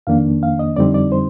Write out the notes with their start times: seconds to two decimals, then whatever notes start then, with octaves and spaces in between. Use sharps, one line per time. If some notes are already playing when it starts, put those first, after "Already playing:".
0.07 F2 D#3 A#3 D4 F5
0.43 F5
0.59 D#5
0.76 F2 D3 G3 C4 D#4 D5
0.94 D5
1.12 C5